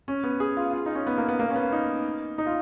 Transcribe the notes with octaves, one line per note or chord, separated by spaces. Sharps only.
C#4
B3
G#4
F4
F4
D#4
C#4
B3
A#3
B3
A#3
C#4
B3
D#4
D#4
F4